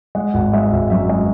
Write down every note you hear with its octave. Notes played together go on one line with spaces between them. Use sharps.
G#3 F#5
G#1 F#5
G#3 E5
G#1 E5
F#2 E5
G#3